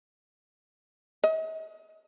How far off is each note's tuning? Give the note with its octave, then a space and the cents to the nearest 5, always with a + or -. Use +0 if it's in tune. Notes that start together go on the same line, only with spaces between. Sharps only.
D#5 +45